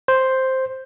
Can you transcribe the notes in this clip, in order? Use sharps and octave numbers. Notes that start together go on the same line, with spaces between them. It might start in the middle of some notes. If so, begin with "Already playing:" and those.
C5